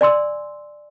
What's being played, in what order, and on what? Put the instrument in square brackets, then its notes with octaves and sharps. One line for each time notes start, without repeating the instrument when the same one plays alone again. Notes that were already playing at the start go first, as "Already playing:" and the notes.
[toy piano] D5 G#5 C6 E6